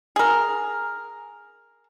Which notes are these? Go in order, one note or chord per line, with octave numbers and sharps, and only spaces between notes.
G#4 A#4